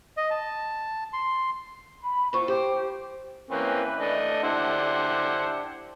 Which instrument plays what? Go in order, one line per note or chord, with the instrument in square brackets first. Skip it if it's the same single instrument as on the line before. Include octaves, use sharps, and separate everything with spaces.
[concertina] D#5
A5
C6
[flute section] B5
[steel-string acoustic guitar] C4 F4 [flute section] C#6
[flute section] G4 [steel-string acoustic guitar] C5
[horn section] E3 B4 [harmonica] A#3 C4 C#4
[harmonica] A3 D4 D#5
[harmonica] D3 C5 F#5 [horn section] D4 E4 G4